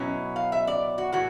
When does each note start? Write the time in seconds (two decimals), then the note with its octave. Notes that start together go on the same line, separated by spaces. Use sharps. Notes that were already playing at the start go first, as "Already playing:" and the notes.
Already playing: B2 F#3 C#4 E4
0.36 F5
0.52 E5
0.67 D5
0.98 F#4
1.12 A2 E3 F#4